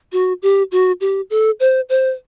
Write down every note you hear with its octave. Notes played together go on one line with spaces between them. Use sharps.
F#4
G4
F#4
G4
A4
C5
C5